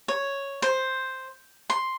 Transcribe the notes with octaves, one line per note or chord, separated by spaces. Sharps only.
C#5
C5
C6